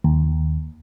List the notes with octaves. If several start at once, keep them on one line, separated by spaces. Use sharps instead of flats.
D#2